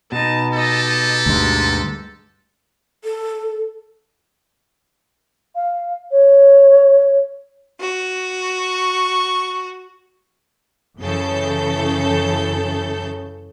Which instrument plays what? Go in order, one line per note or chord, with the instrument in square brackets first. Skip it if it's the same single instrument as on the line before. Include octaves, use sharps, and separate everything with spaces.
[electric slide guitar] B2 D#4 [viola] A5
[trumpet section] G4 A4 [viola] D#5 A5
[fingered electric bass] D2 G2 [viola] G#3
[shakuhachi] A4
[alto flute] F5
C#5
[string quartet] F#4
[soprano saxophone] C#6
[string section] F#2 C#3 E3 A4 G6